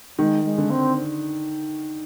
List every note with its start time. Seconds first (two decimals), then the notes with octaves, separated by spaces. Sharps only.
0.18 D#3 G#3
0.45 G#3
0.58 D3
0.70 C4